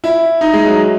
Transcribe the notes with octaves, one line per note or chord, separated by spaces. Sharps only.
E4
D#4
G#3
F#3